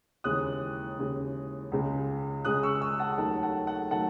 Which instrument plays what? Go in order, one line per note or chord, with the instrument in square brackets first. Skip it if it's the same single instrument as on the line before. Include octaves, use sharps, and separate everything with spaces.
[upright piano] D#2 C#3 E3 G#3 D#6 F#6
D#2 C#3 E3 G#3
C#2 C#3 G#3
C#2 C#3 G#3 D#6 F#6
C#6 E6
C#6 E6
F#5 A5
D#2 D#3 F#3 A3 F#5 A5
F#5 A5
F#5
D#3 F#3 A3 F#5 A5